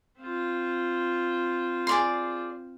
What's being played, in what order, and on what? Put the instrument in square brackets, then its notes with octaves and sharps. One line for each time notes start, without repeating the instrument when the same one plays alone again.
[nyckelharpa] C4 F4
[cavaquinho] G#4 D5 C6